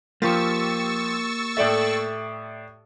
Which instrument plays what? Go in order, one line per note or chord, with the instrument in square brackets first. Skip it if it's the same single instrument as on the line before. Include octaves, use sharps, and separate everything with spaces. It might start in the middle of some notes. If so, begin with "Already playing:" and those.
[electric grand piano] F3 F4 [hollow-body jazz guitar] A#3 [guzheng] G4 [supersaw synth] C#6 E6 A6
[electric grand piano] A2 D5 E5 [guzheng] A4 G5